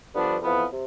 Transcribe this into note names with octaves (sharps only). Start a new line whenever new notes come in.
G2 D3 F3 B3 D4
F2 E3 B3 F4
C3